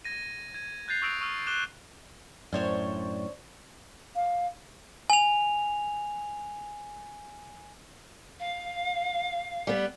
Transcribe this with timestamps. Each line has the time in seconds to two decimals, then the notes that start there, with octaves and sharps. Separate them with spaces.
0.05 G#6 A#6 D#7
0.54 G#6 D#7
0.88 F#6 G6 A6 C7 F7
1.02 C#6 D#6 E6 A#6 D7 F7
1.21 C#6 D#6 F6
1.47 D6 F#6 E7 F7 G7
2.53 F#2 A2 D4 C5 C#5
4.16 F5
5.10 G#5 F7
8.40 F5
9.67 G3 B3